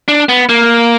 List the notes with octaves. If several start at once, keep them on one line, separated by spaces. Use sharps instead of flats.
D4
B3
A#3